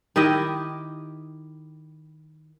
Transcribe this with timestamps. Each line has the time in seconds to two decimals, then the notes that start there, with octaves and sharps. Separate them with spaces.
0.16 D#3 E4 G4 D#5